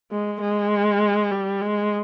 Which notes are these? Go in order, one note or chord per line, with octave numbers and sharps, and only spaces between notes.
G#3
G#3
G3
G#3